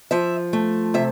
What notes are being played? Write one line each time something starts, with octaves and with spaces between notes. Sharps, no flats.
F3 E5
A3
C3 E5